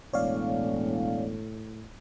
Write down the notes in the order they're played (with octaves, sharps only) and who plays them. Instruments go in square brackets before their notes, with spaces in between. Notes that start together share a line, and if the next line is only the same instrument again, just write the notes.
[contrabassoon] E1 [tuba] A2 [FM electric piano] C#5 D5 F5